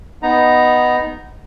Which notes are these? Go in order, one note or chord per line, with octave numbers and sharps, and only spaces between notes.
B3 D#4 A#5